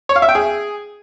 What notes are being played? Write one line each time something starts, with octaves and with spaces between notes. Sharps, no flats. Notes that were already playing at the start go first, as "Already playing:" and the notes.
C#5
F5
E5
G5
G#4